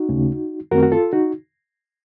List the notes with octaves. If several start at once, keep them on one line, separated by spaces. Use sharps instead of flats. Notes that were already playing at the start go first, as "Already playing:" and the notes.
Already playing: D#4 F#4
D#2 C#3 A3 C#4
F#2 D#3 A3 C4 F#4 A#4
F#4
F4 A4
D#4 F#4